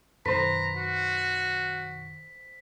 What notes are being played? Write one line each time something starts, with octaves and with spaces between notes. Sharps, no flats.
F#2 B2 D#3 B4 C5 A#5 B6
F#4